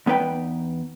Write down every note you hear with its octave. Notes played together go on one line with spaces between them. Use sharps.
E2 B3 D#4 B4 G5